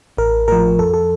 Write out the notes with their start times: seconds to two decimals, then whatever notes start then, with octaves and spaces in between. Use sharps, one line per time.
0.17 A1 A#4
0.48 A2 F3 A#4
0.79 F2 A4
0.94 A4